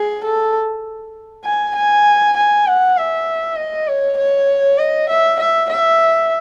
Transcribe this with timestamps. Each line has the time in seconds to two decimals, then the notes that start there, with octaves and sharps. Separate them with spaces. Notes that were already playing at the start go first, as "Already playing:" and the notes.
Already playing: G#4
0.24 A4
1.45 G#5
1.76 G#5
2.37 G#5
2.67 F#5
2.97 E5
3.58 D#5
3.88 C#5
4.18 C#5
4.79 D#5
5.09 E5
5.40 E5
5.70 E5